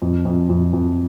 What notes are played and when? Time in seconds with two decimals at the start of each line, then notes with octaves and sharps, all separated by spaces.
0.02 F2
0.25 F2
0.49 F2
0.73 F2